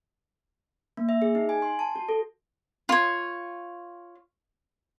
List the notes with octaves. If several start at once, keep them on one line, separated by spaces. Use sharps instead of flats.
A#3
E5
G#4
D#4
G#5
C6
A5
F#4
A4
F4 C#5